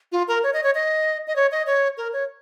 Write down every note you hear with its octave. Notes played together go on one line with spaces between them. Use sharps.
F4
A#4
C#5
D#5
C#5
D#5
D#5
C#5
D#5
C#5
A#4
C#5